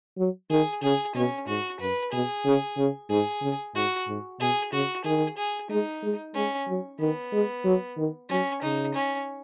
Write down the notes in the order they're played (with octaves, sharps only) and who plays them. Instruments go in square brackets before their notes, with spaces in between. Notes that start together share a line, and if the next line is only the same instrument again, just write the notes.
[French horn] F#3
[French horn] D#3 [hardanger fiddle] G#4
[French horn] C#3 [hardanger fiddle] G#4
[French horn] B2 [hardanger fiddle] C#4
[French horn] G#2 [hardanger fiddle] F#4
[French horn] F#2 [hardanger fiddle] B4
[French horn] B2 [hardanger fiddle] G#4
[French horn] C#3
C#3
[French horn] G#2 [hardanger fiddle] G#4
[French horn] C#3
[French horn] G#2 [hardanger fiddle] F#4
[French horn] G#2
[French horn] B2 [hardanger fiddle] G#4
[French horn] C#3 [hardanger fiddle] F#4
[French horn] D#3 [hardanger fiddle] G#4
[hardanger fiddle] G#4
[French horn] G#3 [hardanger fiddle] D#4
[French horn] G#3
[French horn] G#3 [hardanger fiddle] C#4
[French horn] F#3
[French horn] D#3 [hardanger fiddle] B3
[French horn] G#3
F#3
D#3
[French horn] F#3 [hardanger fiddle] C#4
[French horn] C#3 [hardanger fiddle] D#4
[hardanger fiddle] C#4